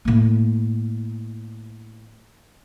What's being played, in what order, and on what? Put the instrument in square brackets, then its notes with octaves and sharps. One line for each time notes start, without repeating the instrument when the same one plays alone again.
[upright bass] A2 A#3